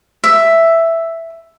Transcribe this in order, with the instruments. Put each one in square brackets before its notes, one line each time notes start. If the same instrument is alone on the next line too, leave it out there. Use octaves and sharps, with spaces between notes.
[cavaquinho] E5